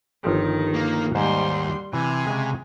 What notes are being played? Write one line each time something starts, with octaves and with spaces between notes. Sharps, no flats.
G1 D#3 F3 G4
A#3
D#2 G#2 G3 C5 C6
C3 E3 G#5
C#3 G#3